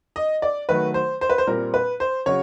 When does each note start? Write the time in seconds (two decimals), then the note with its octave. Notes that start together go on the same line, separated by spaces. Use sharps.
0.16 D#5
0.42 D5
0.69 D#3 F#3 A3 B4
0.94 C5
1.21 C5
1.30 B4
1.38 C5
1.47 A#2 G3 C4 A#4
1.74 B4
2.00 C5
2.26 C#3 F#3 C#5